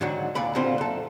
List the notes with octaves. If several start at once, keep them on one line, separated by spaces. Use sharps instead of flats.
G#2 D3 D#3 F#3 F#4
D#2 A#2 D5 B5
A#2 D3 G3 C4 F4 C6
F#2 A4